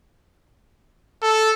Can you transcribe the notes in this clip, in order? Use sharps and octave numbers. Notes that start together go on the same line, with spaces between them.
A4